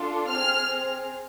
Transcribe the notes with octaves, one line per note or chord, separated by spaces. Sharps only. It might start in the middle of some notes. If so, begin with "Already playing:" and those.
Already playing: D4 F4 A4
C4 G#4 F6